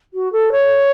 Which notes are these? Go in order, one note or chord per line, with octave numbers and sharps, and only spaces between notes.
F#4
A4
C#5